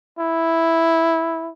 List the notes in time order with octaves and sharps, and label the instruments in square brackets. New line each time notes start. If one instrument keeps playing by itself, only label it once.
[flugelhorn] E4